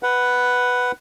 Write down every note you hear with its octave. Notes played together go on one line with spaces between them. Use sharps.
B4 F#5